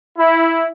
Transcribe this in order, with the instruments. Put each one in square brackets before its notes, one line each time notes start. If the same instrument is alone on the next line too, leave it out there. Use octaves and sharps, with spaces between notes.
[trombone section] E4